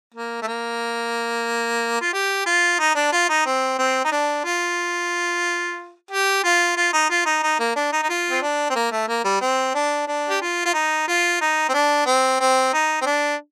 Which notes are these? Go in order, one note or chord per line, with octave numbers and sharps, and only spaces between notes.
A#3
A3
A#3
F4
G4
F4
D#4
D4
F4
D#4
C4
C4
D#4
D4
F4
G4
F4
F4
D#4
F4
D#4
D#4
A#3
D4
D#4
D#4
F4
C4
D4
C4
A#3
A3
A#3
G3
C4
D4
D4
G4
F4
F4
D#4
F4
D#4
C4
D4
C4
C4
D#4
C4
D4